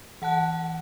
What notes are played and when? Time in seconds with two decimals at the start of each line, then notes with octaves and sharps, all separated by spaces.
0.22 E3 F#5 A5 F#6